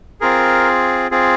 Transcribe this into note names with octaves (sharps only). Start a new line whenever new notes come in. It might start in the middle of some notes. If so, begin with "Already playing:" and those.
C4 F4 G#4 A#4
C4 F4 G#4